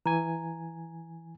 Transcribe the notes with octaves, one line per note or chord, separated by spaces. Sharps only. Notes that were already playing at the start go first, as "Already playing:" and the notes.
E3 G#5 A#5